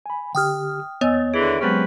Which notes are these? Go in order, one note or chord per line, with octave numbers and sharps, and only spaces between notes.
G#5 B5
D3 G4 G5 D#6 F6
D#2 B3 C#5 D#5 G#5 E6
D3 E3 G#4 D7
C3 F#3 G#3 B3 C#4 B4